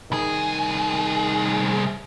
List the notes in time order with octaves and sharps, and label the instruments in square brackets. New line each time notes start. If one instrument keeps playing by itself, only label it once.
[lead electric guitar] C2 G#4 [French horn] D#3